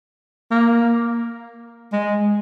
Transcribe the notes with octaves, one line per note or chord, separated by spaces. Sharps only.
A#3
G#3